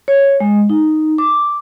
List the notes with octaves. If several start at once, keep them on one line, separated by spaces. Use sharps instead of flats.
C#5
G#3
D#4
D6